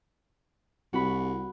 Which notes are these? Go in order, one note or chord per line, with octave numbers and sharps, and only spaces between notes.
C2 F#4 B5